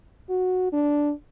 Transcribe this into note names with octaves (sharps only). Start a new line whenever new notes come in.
F#4
D4